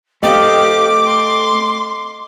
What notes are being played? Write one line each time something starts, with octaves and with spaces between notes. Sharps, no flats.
A3 C4 G4 D#5 F5 D6
C6